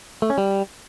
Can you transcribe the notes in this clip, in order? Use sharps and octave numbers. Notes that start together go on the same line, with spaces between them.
A3
C#4
G3